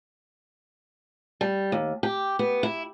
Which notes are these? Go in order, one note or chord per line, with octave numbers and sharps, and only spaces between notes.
G3
D#2
G4
B3
E4